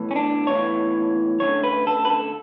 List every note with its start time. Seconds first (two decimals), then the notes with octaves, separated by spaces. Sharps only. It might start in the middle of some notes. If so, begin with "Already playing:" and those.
Already playing: B1 A2 E3
0.11 C#4
0.16 D4
0.47 B1 A2 E3 C#5
1.40 F#2 D3 A3 C#5
1.64 B4
1.87 A4
2.05 B4
2.10 A4